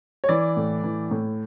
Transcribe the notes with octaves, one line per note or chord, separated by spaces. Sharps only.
C#5
E3 D5
A2
E3
A2